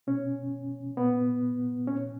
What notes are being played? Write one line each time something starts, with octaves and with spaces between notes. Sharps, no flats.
B2 C#4
A#2 B3
A#2 C#4